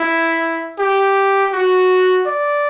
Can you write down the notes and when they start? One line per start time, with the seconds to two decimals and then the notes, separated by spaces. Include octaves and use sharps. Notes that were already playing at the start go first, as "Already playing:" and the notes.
Already playing: E4
0.79 G4
1.53 F#4
2.26 D5